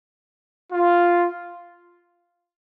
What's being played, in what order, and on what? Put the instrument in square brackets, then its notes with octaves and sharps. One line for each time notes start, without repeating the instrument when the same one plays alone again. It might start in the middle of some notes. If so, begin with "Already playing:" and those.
[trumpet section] F4